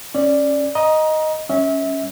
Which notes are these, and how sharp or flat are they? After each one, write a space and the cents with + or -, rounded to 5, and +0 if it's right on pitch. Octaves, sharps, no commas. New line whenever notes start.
C#4 -10 D5 +0
D#5 +0 A#5 +20
G3 +15 C#4 +0 E5 -30